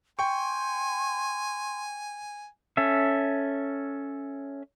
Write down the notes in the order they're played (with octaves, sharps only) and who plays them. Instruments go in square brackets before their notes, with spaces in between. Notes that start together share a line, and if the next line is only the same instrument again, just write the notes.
[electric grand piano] G5 C#6 [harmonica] G#5 [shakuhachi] C6
[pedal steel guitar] C#4 A4 E5